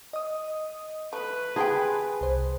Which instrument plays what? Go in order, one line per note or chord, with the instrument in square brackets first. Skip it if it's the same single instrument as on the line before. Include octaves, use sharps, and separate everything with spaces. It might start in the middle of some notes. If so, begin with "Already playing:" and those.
[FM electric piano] D#5 D#6
[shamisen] A3 [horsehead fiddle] B4
[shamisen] G4 D#5 G5 [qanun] G#4 [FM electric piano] A5 B5 C6
[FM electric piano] C2 C5